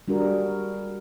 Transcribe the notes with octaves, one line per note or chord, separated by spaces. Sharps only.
G3 D4 F#4 G#4 A#4